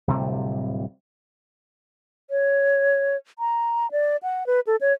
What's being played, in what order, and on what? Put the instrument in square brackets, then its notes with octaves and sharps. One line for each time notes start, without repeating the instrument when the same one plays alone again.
[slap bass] D1 C3 G3
[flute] C#5
A#5
D5
F#5
B4
A4
C#5